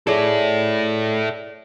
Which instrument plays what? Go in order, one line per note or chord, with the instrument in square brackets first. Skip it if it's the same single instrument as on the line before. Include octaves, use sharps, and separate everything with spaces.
[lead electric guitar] E4 A4 [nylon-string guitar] G#4 C#5 D5